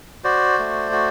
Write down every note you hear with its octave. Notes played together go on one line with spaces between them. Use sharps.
F#4 C5 D5
A3
F#4